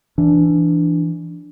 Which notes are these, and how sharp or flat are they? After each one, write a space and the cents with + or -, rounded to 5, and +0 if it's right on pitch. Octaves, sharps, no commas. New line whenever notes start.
E3 +20 D4 +0